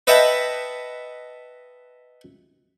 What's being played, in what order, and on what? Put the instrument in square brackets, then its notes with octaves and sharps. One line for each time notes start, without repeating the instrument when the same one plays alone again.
[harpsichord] B4 D#5 E5 F#5 G5 A5